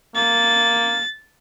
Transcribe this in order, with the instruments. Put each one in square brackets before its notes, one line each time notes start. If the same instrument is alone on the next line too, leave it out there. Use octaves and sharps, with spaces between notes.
[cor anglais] A#3 [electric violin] A6